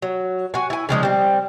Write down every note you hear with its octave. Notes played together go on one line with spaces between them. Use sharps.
F#3
F#4 G#5
E4 G#5
C#3 F3 G#3 D4
G3 C4